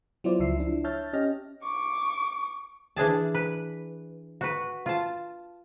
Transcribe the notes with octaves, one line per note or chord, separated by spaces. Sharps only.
F#3 B3 E4 F4 C5 D5
C#2 F3 E5 C7
F3 D4 E4
C#5 E5 A5 F6 G6 A6
C#4 G4 D#5 F6 A#6
C#6 D6
E3 D4 G#4 A5
B4
F#4 B4
F4 A5